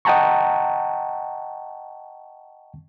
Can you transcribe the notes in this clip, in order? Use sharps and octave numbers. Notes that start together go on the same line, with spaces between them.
D#5 F#5 G5 A5 A#5 C#6